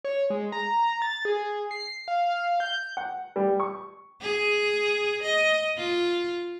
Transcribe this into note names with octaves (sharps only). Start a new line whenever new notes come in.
C#5
G#3
A#5
A6
G#4
C7
F5
G6
F#5
G3
C#6
G#4
D#5
F4